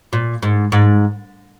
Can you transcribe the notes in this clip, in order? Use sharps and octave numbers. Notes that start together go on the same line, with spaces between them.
A#2
G#2
G#2